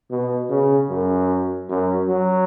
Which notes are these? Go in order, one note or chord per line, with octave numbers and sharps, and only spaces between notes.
B2
C#3
F#2
F#2
F#3